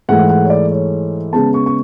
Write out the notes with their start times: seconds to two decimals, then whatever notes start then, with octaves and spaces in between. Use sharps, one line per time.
0.09 G#2 E3 A3 F#5
0.29 F#5
0.45 C#5
0.50 D5
0.72 C#5
1.33 C#3 G#3 B3 A5
1.54 C#6
1.66 C#6